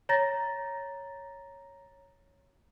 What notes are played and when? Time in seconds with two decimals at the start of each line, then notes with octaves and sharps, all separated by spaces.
0.09 C#5 A#5 A6 A#6